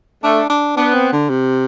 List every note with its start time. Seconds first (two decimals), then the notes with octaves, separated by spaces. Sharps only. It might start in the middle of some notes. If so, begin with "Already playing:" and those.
0.23 A3 D4
0.50 D4
0.76 B3 D4
0.95 C4
1.13 D3
1.30 C3